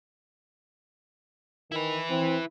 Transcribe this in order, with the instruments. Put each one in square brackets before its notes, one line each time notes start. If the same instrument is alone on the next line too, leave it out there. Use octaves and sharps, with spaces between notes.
[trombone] D#3 [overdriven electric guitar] E4 B4
[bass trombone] E3 [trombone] C4